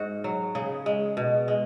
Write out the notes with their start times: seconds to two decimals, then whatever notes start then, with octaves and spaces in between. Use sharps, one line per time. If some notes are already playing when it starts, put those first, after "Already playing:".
Already playing: G#2 F#4
0.24 F#3
0.55 C#3 G#4
0.86 G#3
1.17 B2
1.48 G#3